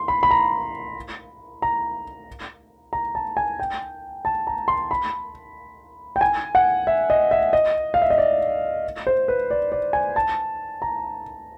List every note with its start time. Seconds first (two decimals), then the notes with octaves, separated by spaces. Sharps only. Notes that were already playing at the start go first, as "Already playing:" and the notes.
Already playing: C6
0.08 B5
0.23 B5
0.31 A#5
1.62 A#5
2.93 A#5
3.15 A5
3.37 G#5
3.60 G5
4.25 A5
4.47 A#5
4.68 C6
4.91 B5
6.16 G5
6.21 G#5
6.55 F#5
6.87 E5
7.10 D#5
7.31 E5
7.53 D#5
7.94 F5
8.02 E5
8.10 D#5
8.18 D5
9.07 C5
9.28 B4
9.50 D5
9.72 D5
9.93 G#5
10.16 A5
10.82 A#5